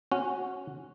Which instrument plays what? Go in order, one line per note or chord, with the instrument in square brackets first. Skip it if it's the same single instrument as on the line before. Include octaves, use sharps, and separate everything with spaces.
[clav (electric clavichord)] C#4 F#4